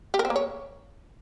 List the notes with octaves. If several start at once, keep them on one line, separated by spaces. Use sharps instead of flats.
G4
A#4
C4
A#3
C#5